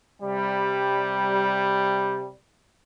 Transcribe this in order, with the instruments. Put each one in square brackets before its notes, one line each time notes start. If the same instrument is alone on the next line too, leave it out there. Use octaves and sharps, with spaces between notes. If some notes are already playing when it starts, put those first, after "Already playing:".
[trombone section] C3 G3